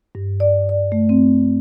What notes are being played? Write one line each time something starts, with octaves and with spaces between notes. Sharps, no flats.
G2
D5
D5
A3
C4